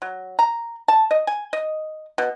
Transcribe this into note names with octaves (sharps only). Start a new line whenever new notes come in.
F#3
A#5
A5
D#5
G#5
D#5
B2